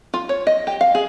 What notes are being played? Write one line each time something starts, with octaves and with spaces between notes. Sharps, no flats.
F4
C#5
D#5
G4
F5
G#4